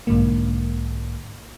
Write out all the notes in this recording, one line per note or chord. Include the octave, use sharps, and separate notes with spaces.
B1 G#2 D3 A#3